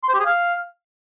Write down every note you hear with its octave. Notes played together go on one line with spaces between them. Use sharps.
C6
C5
G4
G#4
F5